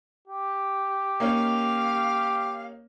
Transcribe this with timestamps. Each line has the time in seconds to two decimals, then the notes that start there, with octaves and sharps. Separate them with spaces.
0.28 G4
1.20 A#3 C#4 D#4 F5